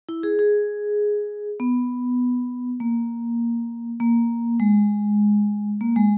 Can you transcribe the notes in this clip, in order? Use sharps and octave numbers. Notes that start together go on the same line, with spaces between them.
E4
G#4
G#4
B3
A#3
A#3
G#3
A#3
G#3